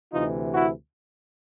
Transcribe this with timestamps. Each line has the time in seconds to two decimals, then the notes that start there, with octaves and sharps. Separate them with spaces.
0.12 D2 C3 E3 D#4 F4
0.55 E4 F#4